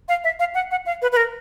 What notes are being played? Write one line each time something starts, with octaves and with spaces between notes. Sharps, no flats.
F5
E5
F5
F#5
F#5
F5
B4
B4
A#4